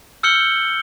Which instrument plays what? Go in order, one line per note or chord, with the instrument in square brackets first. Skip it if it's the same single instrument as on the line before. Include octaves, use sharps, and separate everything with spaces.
[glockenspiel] E6 F6 G6 C#7 F#7 G7